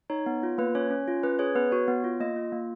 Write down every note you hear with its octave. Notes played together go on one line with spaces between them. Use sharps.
D#4 C#5
B3
F4
A#3 B4
C#4 C#5
C#4
F4
C#4 B4
G#4 C#5
B3 B4
F#4 C#5
B3
F4
A#3 D#5
F4
A#3